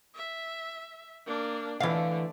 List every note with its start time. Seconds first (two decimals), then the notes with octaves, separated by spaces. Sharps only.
0.15 E5
1.26 A#3 D4
1.80 D3 E3 A3 F5